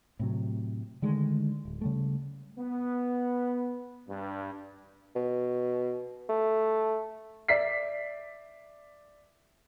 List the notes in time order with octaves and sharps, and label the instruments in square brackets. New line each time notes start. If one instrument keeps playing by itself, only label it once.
[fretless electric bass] A2 C3 F#3
D3 D#3 G#3 A3
D1
C#3 G3 A3
[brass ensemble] B3
G2
[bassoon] B2
A3
[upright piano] D5 E5 B6 C7